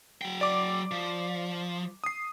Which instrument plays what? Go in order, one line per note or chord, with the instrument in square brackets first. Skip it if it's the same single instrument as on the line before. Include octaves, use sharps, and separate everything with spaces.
[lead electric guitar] F#3 G5
[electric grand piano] D5 D6
[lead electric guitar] F3
[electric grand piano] D#6 C7